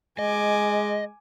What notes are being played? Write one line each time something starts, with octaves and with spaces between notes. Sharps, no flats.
G#3 D#5 G#5 D6